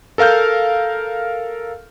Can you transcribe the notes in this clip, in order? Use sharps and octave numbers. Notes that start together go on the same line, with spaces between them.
A4 A#4 F5 F6 G6